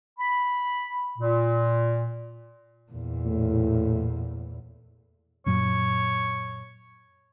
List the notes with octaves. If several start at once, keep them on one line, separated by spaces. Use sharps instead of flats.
B5
A#2
E2 A#2
A2
F#2 A#2 F#3 C#5